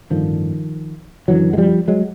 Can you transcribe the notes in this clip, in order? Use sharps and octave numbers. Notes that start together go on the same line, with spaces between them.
A1 G2 D3 D#3 F3
F#1 F#2 D3 E3 F#3
G#3
F3 G3
F#3 G#3